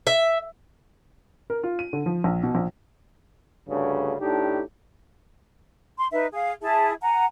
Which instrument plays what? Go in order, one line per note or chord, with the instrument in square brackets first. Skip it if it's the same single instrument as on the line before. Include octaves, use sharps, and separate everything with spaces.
[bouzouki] E5
[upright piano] A#4
F4
D#7
D3
F3
A#1
B2
A#1
[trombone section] D2 G2 C#3
A2 D4 D#4 G4
[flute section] C6
D#4 B4 E5
G#4 F5
E4 G#4 E5 A5
F#5 G#5 A#5